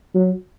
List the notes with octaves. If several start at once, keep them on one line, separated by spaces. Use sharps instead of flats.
F#3